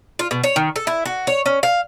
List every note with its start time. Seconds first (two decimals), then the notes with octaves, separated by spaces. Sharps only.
0.19 F4
0.31 B2
0.44 C#5
0.56 D#3
0.76 A4
0.87 E4
1.06 F#4
1.27 C#5
1.46 C#4
1.63 F5